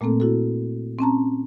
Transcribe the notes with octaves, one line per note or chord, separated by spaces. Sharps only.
A#2 A3 A#3 C4 A4
E4 F#4 A4
C4 C#4 A5 A#5